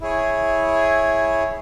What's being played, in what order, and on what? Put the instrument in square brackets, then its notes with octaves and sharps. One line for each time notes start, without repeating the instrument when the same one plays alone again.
[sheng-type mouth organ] E4 G#4 C#5